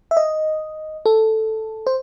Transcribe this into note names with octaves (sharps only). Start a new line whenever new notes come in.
E5
D#5
A4
C5